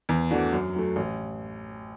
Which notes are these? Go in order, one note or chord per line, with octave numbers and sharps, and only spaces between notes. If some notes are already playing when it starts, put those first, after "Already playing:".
E2
E3 A3 D4 F#4
F#2
F#3 A3
A1